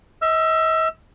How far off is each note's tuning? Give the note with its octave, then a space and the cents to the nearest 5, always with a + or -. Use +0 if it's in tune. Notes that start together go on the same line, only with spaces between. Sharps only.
D#5 +45 E6 +25